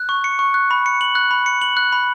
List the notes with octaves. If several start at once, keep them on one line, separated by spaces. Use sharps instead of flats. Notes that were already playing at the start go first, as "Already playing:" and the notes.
Already playing: F#6
C#6
C#7
C#6
F#6
B5
C#7
F#7
F#6
B5
C#7
F#7
F#6
B5